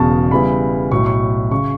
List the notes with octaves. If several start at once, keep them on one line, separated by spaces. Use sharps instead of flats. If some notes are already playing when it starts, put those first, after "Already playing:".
Already playing: E1 E2 C#3 A5 C#6
E2 C#3 E3 G3 B5
B1 A2 F#3 C#6
C#6
C#3 C#6